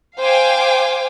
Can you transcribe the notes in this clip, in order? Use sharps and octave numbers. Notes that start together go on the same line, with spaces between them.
C5 F5 G5 G#5 D6